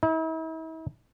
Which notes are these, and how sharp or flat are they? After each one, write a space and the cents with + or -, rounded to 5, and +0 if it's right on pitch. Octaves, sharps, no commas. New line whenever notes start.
E4 -45